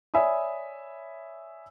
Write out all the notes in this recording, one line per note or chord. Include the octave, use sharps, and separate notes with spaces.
C#5 D5 E5 G#5 B5 D#6